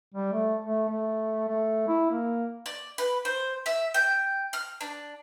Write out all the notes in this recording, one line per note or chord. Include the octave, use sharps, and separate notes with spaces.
G3
A3
A3
A3
A3
E4
A#3
D5
B4
C5
E5
G5
F6
D4